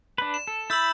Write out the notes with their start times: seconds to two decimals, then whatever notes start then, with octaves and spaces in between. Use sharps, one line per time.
0.18 D4 B4
0.34 E7
0.47 A4
0.70 E4 B5 E6 G6 A6